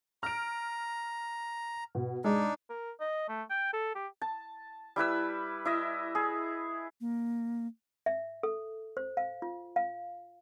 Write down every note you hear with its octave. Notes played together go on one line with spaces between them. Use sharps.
A#5 F6 D7
B2
G#3 D4 D#4
A#4
D#5
A3
G5
A4
G4
A5
G3 E4 B4 E6
E4 D#5 E5
G#4
A#3
E5
A4
C5
F5
F4
F5